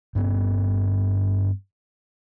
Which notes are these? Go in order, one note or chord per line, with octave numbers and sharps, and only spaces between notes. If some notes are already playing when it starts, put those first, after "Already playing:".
G2 B3 C#4